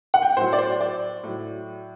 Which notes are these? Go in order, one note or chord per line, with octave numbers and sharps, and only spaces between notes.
F#5
G5
A2 F#3 C5
D5
C5
D5
A2 F#3